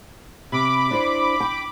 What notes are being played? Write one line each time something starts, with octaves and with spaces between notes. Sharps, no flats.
C3 B5 D6
D4 E4 C5
G5